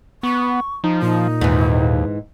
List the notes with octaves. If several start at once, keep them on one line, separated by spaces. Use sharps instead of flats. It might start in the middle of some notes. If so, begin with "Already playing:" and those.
B3 C#6
F3 D#4
A#2 D#4
D#2 G#2 E3